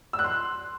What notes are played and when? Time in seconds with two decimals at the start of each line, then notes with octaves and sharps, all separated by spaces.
0.13 E6
0.19 F#6
0.24 C6